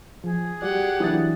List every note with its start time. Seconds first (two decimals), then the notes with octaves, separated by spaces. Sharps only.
0.24 F3 G#4
0.62 G3 F#4 G4 D5 F#5
1.00 E3 F#3 D4 D#6 A6